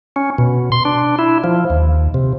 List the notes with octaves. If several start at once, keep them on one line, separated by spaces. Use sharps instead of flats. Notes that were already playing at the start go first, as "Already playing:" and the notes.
C#4
B2
C6
D4
E4
F3
D#2
C3